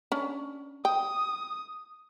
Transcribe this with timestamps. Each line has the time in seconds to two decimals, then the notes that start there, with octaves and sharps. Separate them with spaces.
0.12 C#4 D4
0.85 G5 D#6